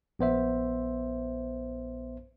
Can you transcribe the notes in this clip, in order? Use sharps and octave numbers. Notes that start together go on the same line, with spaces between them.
A#1 B3 C5 E5